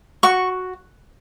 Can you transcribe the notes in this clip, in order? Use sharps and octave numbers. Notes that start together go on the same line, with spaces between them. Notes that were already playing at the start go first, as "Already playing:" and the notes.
F#4 C#6